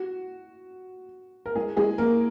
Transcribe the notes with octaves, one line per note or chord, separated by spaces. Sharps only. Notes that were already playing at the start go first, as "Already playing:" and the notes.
Already playing: F#4
A#4
G#3 G#4
G#3 G#4
A#3 A#4